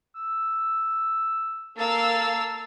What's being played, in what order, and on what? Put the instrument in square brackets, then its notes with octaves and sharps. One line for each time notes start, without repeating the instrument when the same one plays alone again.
[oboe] E6
[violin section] A#3 F5 E6 [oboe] A4